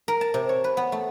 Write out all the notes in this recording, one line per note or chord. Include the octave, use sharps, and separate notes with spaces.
A#4
A5
C3
C#5
B4
B3
A3